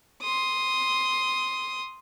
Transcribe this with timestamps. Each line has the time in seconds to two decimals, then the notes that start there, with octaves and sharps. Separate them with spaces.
0.22 C6 D#6